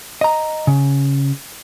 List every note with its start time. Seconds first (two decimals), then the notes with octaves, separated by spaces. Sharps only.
0.21 D#5 A#5
0.67 C#3